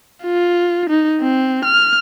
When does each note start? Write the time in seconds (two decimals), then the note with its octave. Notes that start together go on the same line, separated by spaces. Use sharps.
0.23 F4
0.90 D#4
1.21 C4
1.65 F6